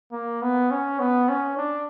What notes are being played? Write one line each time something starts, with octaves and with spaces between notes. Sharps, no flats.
A#3
B3
C#4
B3
C#4
D4